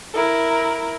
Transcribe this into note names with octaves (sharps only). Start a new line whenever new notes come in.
E4 A#4